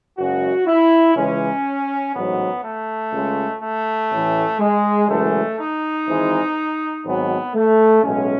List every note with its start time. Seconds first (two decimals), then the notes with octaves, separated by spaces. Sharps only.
0.18 F#1 F#2 C#3 G#3 F#4
0.67 E4
1.16 C#2 C#3 E3 G#3 C#4
2.14 A1 G#2 F#3 B3
2.63 A3
3.13 C#2 C#3 G#3
3.62 A3
4.11 A1 A2 E3
4.60 G#3
5.08 F#1 F#2 E3 G#3 A3
5.58 D#4
6.07 G#1 G#2 E3 G#3
7.05 G#1 G#2 D#3 F#3 B3
7.54 A3
8.03 B1 A2 G#3 C#4